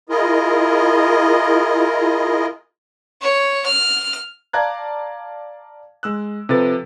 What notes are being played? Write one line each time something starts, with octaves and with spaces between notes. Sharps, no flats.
E4 F4 G#4 A#4 D#5
C#5
F6
D5 F5 A5 A#5 F#6 G#6
G#3 E6 F#6
C3 F3 A4 B4 A6